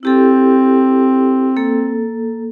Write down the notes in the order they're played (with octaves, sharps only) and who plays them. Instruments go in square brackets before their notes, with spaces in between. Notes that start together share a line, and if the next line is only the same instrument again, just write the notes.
[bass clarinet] C4 [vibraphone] E4 G4 A4
[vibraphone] A#3 A4